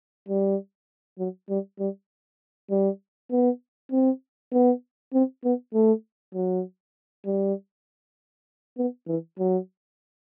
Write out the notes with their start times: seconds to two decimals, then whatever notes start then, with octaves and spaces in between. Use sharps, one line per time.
0.28 G3
1.18 F#3
1.49 G3
1.79 G3
2.70 G3
3.31 B3
3.92 C4
4.53 B3
5.13 C4
5.44 B3
5.74 A3
6.34 F#3
7.26 G3
8.78 B3
9.08 E3
9.39 F#3